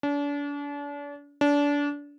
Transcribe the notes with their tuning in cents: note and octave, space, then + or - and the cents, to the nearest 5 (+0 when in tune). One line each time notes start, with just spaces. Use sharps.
D4 -40
D4 -30